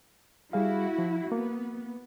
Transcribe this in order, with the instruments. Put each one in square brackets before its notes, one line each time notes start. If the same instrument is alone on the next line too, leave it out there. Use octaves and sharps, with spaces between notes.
[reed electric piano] G3 G#4 F5 [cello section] E4 F#4
[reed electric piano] F3
[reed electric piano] A#3 [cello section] B3